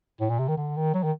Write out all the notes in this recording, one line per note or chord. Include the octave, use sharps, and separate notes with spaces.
A2
A#2
C3
D#3
D3
D#3
F#3
D#3